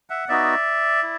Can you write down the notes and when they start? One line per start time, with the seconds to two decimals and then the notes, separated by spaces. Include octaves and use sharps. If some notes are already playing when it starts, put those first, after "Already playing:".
0.10 E5 F#5
0.29 B3 D#4 F#4 D5 E5
1.03 E4